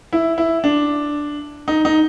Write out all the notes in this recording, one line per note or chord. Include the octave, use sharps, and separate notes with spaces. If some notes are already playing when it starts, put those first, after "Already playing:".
E4
E4
D4
D#4
D#4